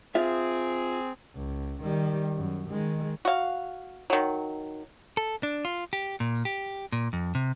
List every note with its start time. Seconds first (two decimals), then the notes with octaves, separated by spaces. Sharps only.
0.15 C4 F4 G#4 E5
1.35 C#2
1.82 D#3 G3
2.36 F#2
2.70 D#3 G#3
3.25 F#4 F5
4.10 D#3 F#3
5.17 A4
5.43 D4
5.65 F4
5.93 G4
6.20 A#2
6.45 G4
6.92 A#2
7.13 F2
7.35 C3